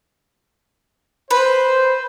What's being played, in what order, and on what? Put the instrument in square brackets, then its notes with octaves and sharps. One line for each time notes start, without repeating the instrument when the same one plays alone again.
[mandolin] B4 [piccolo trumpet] C5